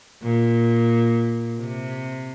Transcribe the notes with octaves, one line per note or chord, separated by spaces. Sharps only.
A#2
C3